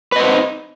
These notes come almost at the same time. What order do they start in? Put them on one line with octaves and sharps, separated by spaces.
B4 D#5 C4 D#4